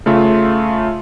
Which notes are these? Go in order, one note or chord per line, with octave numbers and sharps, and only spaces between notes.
C#3 A3 F4 E5